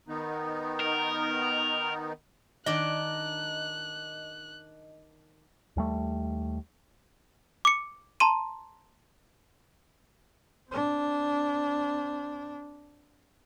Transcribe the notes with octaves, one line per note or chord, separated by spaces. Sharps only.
D#3 B3 D#4
A#4
D#3 D4 D5 D#5 F#6
D#2 G3 A3
D6 C#7
A5 A#5 C6 D#7
C4 D4